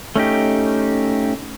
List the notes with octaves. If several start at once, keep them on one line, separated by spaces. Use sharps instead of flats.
A3 C#4 D#4 G4